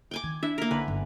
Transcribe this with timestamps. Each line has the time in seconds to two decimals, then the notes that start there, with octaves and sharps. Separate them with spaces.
0.11 G5 G#5 D6
0.24 D#3 G#6
0.43 D4 E4 E5
0.58 A#3 A#4
0.71 B1 D3 B4 G#5
0.88 G1